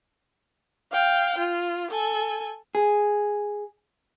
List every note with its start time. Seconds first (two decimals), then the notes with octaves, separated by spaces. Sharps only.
0.92 F5 G5
1.38 F4
1.91 A4 G#5
2.75 G#4